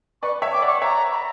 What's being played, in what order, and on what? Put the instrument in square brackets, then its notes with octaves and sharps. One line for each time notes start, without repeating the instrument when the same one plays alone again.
[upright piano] B4 D5 [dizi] C#6
[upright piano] C#5 E5
[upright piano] G5 [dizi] D6
[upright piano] D5 F#5
[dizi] C#6
[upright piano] C#5 E5 [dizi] A#5
[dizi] B5
A#5